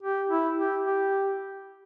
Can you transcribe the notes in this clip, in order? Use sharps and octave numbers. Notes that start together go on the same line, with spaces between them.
G4
E4
G4
G4